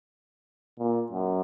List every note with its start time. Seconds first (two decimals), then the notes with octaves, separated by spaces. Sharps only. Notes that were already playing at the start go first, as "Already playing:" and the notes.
0.79 A#2
1.12 F#2